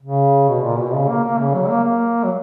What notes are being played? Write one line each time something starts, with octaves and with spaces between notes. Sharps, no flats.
C#3
B2
A#2
B2
C#3
A#3
A#3
C#3
F#3
A#3
A#3
F#3